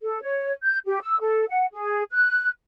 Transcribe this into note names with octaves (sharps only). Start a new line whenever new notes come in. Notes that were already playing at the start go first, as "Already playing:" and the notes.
A4
C#5
G6
G4
E6
A4
F#5
G#4
F#6